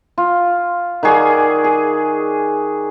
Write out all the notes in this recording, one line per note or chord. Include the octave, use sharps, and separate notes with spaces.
F4
D#3 F#4 G#4 D5
G#4